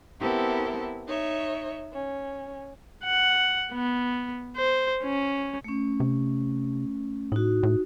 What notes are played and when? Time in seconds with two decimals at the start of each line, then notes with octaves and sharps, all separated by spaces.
0.20 B3 C4 E4 G4 A4 A#4
1.08 D#4 C#5 E5
1.93 C#4
3.04 F#5
3.72 B3
4.57 C5
5.03 C#4
5.64 A3 C#4
6.00 C3
7.32 A2 D#4 F#4
7.63 A2